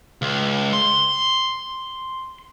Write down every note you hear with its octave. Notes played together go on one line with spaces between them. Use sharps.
C#2
C6